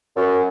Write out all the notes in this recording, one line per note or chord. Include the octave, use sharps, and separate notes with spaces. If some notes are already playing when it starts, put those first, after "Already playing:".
F#2